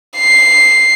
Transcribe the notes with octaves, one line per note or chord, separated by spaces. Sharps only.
C7